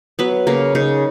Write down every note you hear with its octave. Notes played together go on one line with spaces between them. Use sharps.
F#3 B3 B4
C#3 A#3 A#4
C#3 D#4